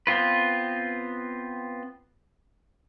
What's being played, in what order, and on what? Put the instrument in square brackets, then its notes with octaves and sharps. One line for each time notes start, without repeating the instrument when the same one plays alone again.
[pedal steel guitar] B3 C4 F4 B4